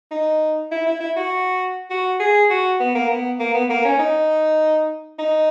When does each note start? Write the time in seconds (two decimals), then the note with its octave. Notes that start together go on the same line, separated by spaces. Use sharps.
0.11 D#4
0.71 E4
0.87 E4
1.00 E4
1.16 F#4
1.90 F#4
2.20 G#4
2.50 F#4
2.80 B3
2.95 A#3
3.10 B3
3.40 A#3
3.54 B3
3.70 A#3
3.85 C#4
3.99 D#4
5.19 D#4